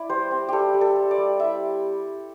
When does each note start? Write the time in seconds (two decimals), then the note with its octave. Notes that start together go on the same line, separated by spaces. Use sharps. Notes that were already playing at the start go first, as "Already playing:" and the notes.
Already playing: E4 D5
0.09 G3 C5
0.31 C4
0.49 G3 G4 A4
0.74 G3
0.81 A4
0.96 G3
1.11 D5
1.18 G3
1.39 E4 E5